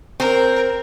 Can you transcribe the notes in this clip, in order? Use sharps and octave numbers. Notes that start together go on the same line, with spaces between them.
C4 A#4